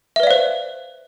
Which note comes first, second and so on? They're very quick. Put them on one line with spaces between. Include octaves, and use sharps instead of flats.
E5 B4 D5 F5 C5